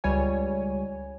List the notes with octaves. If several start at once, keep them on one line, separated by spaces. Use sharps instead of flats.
C#2 G3 C#5 G#5